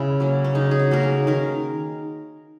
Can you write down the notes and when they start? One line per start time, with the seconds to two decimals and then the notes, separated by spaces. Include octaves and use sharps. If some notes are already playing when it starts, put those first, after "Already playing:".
Already playing: C#3 E4
0.20 F#3 A#3 C#4
0.44 C#4
0.55 C#3 D#4
0.71 G#4
0.79 F#4
0.91 F#3 A#3 C#4 A#4
1.03 G#4
1.27 D#3 A#4